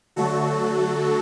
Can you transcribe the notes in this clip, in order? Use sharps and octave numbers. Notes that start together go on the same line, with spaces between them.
D3 F#3 A3 F#4 A4